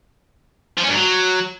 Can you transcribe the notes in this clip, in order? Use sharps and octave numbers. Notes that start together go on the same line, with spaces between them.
F3
C#4
G2
F#3